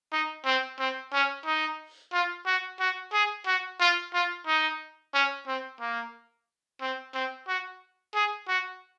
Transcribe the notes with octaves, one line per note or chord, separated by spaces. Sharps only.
D#4
C4
C4
C#4
D#4
F4
F#4
F#4
G#4
F#4
F4
F4
D#4
C#4
C4
A#3
C4
C4
F#4
G#4
F#4